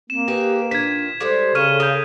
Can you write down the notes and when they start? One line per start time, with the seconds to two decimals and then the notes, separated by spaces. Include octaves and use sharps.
0.10 A#3 C4 E7
0.28 D#4 G4 G#4 B4
0.71 A#2 D#3 D4 B4 G#6 B6
1.20 G3 G#3 A4 C5
1.55 C#3 C#5 F6 D#7 E7
1.80 A#4 F5 D#6 G6